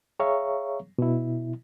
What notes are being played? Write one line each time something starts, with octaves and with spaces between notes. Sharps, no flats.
G#4 C#5 E5 F5 A#5 C#6
B2 E4